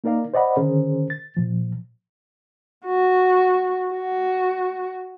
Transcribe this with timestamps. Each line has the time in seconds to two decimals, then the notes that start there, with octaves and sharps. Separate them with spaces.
0.04 A#3 D#4 A#4 D5 F5
0.34 C5 D5 D#5 F#5 B5
0.56 D3 D#3 C#4 G#4 A#4 C5
1.10 A6
1.37 A#2 F3
2.86 F#4
3.92 F#4